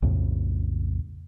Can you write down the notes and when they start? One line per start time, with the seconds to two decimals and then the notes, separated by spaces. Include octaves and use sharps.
0.02 B1 F2 A2 C#3